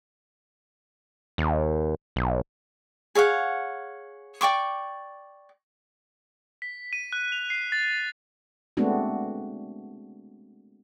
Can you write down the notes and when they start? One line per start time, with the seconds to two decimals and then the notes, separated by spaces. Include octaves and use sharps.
1.38 D#2
2.16 B1
3.15 G#4 C#5 F5 F#5
4.41 D5 G5 C#6 D6
6.62 B6
6.93 D#7
7.13 F#6
7.32 F7
7.50 C7
7.72 A6
8.77 G#3 A3 B3 C4 D4 F#4